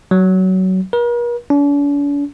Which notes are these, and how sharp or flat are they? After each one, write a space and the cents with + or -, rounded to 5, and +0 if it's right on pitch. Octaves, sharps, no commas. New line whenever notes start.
F#3 +20
A#4 +45
D4 -45